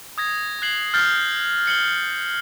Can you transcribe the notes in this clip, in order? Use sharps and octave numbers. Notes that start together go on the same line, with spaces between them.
D#6 G#6 A#6
F#6 G#6 C7 F#7
F6 G6 A6 C7 G7
C7 C#7 F#7 G7